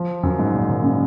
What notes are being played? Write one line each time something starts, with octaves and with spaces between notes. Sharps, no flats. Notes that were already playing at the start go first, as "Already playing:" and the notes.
Already playing: F3
F#2
G#2
A#2
A#2
C#3